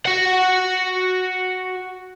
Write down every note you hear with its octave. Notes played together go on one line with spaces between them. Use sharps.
F#4 F#5